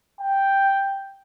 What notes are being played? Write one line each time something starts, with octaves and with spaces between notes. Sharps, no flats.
G5